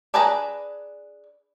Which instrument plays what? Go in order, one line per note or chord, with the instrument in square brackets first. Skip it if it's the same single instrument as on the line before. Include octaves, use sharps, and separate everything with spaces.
[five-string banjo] D4 G#4 B4 A5 A#5